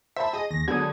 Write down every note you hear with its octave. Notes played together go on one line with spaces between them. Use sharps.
C5 E5 A5 B5
G#4 D#5
D#2 A#6
D3 F#3 G#3 B3 G4 D#6 G#6